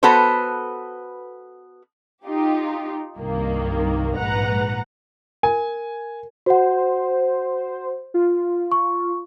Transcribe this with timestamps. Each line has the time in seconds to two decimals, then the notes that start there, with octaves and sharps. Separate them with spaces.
0.03 B3 F#4 A4 B4 C5
2.26 D#4 F4 G4
3.18 C2 G2 D#3 A#3
4.16 A#1 G#2 B4 F#5 A#5
5.43 A#4 G#5
6.46 F#4 C5 F#5
8.14 F4
8.72 C#6